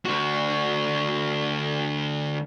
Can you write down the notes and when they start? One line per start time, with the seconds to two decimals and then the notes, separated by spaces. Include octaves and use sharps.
0.05 D2 F#4